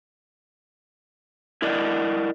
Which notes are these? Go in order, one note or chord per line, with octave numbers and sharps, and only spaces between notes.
E4 A#4 D5 D#5